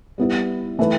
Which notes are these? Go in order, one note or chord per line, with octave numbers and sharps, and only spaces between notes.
G3 B3 E4 B4
E3 A3 E4 B4